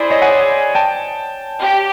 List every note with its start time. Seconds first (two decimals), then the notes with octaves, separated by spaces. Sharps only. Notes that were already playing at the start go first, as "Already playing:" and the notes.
Already playing: E4 G#4 C5 D5
0.10 C#5 D#5
0.22 F#5 G#5
0.75 G5 A5
1.62 G4